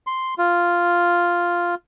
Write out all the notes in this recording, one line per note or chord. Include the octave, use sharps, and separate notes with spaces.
C6
F4